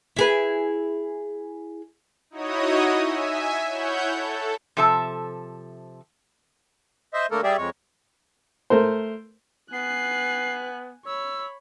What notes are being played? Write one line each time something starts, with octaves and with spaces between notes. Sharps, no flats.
E4 G#4 B4
D#4 E4 F#4 C#5 D#5 D#6
E5 G#5
E4 C#5 F#5 G6
A4
C3 F3 A4 E5 A5
C5 D#5 E5
D3 A3 A#3 A4 A#4
G3 G4 G#4 D5 E5
F2 G#3 C#5
A3 A#4 C5
B3 G#5 F#6 C7
C#5 B5 E6